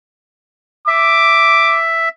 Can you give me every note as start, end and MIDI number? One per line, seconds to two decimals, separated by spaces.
0.88 2.09 76
0.88 1.82 86